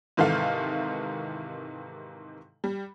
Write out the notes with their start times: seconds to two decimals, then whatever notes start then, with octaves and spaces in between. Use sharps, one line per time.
0.17 G#2 C3 D#3 E3 A4 F5
2.64 G3